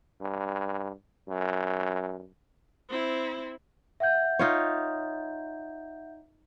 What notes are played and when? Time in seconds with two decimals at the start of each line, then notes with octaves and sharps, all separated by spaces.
0.21 G2
1.29 F#2
2.89 C4 E4
4.00 E5 F#5 G6
4.39 D#4 F4 C#5